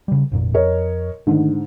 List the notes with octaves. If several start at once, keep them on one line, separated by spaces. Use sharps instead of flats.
C#3 G3
G#1 F2 A#2
F2 A#4 C#5 D#5
G#2 D3 D#3 G#3 A3